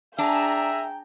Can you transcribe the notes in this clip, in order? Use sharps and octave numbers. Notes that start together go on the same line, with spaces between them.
D4 G#4 E5 G5 A#5